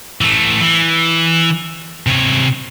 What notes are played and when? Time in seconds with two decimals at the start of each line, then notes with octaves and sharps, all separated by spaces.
0.21 E3 A3
0.61 E3
2.07 C3 C#5